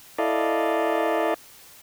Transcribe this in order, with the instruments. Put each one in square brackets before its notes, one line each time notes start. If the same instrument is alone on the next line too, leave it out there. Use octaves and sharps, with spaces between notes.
[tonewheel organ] E4 A4 D5 D#5 F5